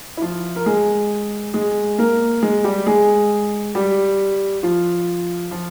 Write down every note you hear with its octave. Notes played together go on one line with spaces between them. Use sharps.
E4
F3 F4
A#4
G#3 G#4
G#3 G#4
A#3 A#4
G#3 G#4
G3 G4
G#3 G#4
G3 G4
F3 F4
F3 F4